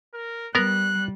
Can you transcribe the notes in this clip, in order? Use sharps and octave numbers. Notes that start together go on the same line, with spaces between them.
A#4
G3 B3 A#4 F#6